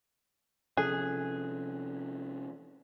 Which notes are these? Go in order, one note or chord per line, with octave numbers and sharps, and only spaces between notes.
C3 F3 C#4 G#4 A4 F#6